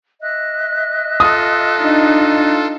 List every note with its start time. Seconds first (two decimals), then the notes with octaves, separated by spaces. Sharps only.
0.22 D#5 E5 F#6
1.20 F4 A4 D#6
1.78 D4 D#4